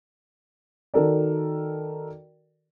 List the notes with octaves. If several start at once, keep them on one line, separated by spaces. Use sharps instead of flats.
D#3 F#4 A4 A#4 D5